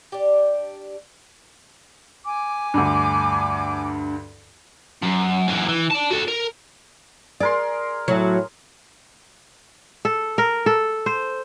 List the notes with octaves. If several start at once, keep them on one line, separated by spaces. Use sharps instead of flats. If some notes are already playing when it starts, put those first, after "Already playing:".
D4 G4
G#5 D6
D2 G2
F#2
F#2 E3
E3
D5 A5
F#4 A4
A#4
G#4 A#4 D5 C6
A2 F#3
A4
A#4
A4
C5